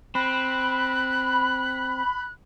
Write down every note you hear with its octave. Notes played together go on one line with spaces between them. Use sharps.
C4 B5 F#6